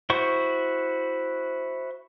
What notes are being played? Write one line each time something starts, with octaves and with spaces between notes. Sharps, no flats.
E4 F#4 C5 C#6